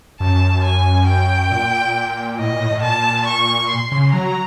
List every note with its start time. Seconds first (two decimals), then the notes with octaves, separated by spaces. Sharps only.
0.20 F#2 A5
0.64 G#5
1.07 G5
1.51 A#2
2.38 A2 D#5
2.49 A#2
2.60 A2
2.71 A2
2.82 A#2 A5
3.26 C#6
3.69 C6
3.92 C#3
4.13 F#3 A#5